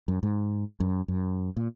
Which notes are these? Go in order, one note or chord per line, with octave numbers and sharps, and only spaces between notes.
F#2
G#2
F#2
F#2
A#2